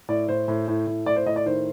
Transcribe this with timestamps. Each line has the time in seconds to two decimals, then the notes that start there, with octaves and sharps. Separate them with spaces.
0.09 A2 D5
0.29 A2 C5
0.48 A2
0.68 A2
0.87 A2
1.06 A2 D5
1.16 C5
1.26 A2 D#5
1.36 D5
1.46 D#3 C5